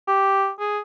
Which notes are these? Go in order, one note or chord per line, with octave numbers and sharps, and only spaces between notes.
G4
G#4